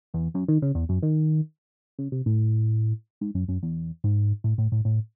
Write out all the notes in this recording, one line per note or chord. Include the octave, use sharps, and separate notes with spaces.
E2
F#2
D#3
C#3
E2
F#2
D#3
C#3
C3
A2
G#2
F#2
F#2
E2
G#2
A2
A2
A2
A2